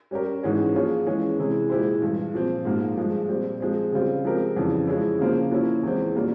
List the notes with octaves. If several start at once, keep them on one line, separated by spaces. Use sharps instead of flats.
G3 C#4 G4 A#4
G#2 E3 G#3 C#4
F3 A#3 F4 G#4 C#5
E3 G#3 C#4
C3 E3 G#3 E4 G#4
A#2 G#3 E4 G4 C5
G2 E3 G#3
A#2 F3 C4
G#2 F3 A#3 F4
G2 F3 G#3
A#2 G3 C4
F3 G#3 C4
C#3 G3 C4 F4
F3 G#3 C4 G4 A#4
F2 C#3 E3 G3
F3 G#3 C#4 E4
C#3 F3 A#3 F4 C5
F3 A#3 C#4 E4
E2 E3 G#3 C4
A#2 G3 A#3 C#4 F4